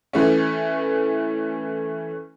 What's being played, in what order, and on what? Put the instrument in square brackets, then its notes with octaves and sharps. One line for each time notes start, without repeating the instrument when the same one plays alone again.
[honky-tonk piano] E3 A3 C#4